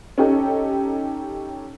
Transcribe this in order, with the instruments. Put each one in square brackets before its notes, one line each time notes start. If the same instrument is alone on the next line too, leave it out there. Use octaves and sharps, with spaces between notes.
[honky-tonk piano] C#4 D#4 G4 A4